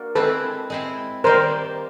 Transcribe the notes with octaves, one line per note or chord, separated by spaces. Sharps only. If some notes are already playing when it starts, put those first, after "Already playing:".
Already playing: A#3 D4 F#4
G#3 C4 E4 A4 B4
G#3 C4 E4
D#3 G3 A#3 A#4 C5